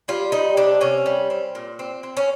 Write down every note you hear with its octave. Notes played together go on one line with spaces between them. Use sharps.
G3 F4
G3 D#4
C3 D4
C3 C#4
G3
C4
A#2
C4
C4
C#4